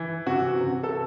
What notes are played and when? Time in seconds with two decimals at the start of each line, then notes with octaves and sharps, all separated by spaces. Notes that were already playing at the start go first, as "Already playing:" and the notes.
Already playing: E3
0.26 C3 F#4
0.61 C3
0.83 A4